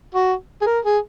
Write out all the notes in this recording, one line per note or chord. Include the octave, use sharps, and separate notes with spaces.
F#4
G#4
A#4
G#4